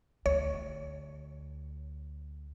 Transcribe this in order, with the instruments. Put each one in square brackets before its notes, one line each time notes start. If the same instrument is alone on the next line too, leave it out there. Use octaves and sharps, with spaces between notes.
[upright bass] D2 [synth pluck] C#5